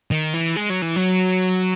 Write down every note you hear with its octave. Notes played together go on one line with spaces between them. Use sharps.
D#3
E3
G#3
F#3
E3
F#3